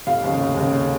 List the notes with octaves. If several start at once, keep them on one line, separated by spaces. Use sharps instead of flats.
F1 F5
D#2 C#3
F1
D#2 C#3